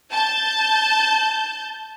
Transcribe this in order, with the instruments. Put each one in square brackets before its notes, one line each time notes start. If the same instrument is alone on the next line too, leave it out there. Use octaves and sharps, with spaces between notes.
[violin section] A5 G6